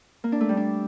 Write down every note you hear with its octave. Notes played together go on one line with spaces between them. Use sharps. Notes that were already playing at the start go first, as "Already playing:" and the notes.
A#3
D4
A3
G3
D4